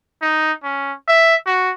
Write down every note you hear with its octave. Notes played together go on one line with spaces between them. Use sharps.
D#4
C#4
E5
F#4